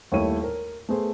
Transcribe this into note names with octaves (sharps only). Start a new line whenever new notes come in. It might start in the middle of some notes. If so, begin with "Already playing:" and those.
D#2 G3 A3 E4 C#5 D#7
A#4
A3 B3 G#4 C5